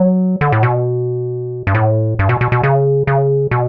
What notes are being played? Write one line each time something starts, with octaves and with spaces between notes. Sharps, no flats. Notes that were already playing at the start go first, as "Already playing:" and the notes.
Already playing: F#3
D3
A2
B2
G2
A2
G2
B2
B2
B2
C#3
C#3
B2